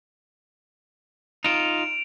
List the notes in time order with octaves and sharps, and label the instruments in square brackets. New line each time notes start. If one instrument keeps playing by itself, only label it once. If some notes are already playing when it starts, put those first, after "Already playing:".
[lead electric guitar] D#4 F4 [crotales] D7 E7 F7